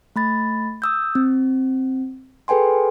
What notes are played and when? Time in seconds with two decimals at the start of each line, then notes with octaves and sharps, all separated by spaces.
0.16 A3 B5 A6
0.82 D#6 E6 G6
1.15 C4
2.48 G#4 A4 B4 G5 G#5 C6